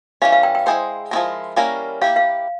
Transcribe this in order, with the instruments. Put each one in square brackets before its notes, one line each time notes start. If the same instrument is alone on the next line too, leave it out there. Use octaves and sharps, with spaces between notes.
[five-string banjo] E3 G3 C#4 [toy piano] F5
[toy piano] F5
G5
G5
[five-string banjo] G#3 E4 G#4 C5 [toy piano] G5
[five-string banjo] F3 G#3 C4 E4 A#4
G3 A#3 C#4 E4 A#4
[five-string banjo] A#3 E4 G4 [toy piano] F5
[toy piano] F5